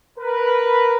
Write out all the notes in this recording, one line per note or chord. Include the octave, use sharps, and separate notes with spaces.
A#4 B4